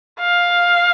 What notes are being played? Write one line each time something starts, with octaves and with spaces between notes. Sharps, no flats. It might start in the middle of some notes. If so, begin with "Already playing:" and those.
F5